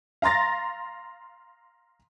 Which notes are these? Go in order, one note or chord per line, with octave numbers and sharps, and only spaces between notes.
F5 A#5 C6 A6 A#6